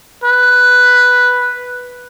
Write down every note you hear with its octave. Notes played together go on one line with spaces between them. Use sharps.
B4